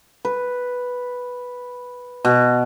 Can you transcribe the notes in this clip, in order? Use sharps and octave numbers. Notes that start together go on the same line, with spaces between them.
B4
B2